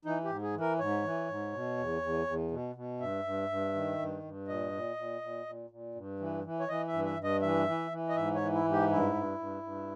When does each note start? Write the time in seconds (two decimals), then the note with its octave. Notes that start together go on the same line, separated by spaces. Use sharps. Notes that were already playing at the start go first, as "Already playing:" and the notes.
0.05 E3 D#4
0.24 G4
0.30 G#2
0.42 G#4
0.55 E3
0.60 A#4
0.79 G#2 C#5
1.03 E3
1.29 G#2
1.53 B2
1.77 E2
2.02 E2
2.27 E2
2.51 B2
2.76 B2
3.00 G2 E5
3.24 G2
3.49 G2
3.74 D#3
3.98 G2
4.23 G2
4.48 A#2 D#5
4.72 A#2
4.96 A#2
5.21 A#2
5.46 A#2
5.70 A#2
5.95 G2
6.19 E3
6.44 E3
6.60 C#5
6.68 E3 D#5
6.87 E5
6.93 G2
7.05 E5
7.18 G2
7.24 D#5
7.42 E3 E5
7.67 E3
7.91 E3
8.09 D#5
8.16 G#2 E5
8.35 C#5
8.41 E3
8.53 E4
8.65 G#2
8.72 G4
8.90 G2 E4
9.15 G2
9.39 G2
9.63 G2